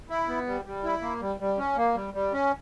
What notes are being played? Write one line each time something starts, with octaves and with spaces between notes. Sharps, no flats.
E4
B3
G3
G3
E4
A#3
G3
G3
C#4
A#3
G3
G3
C#4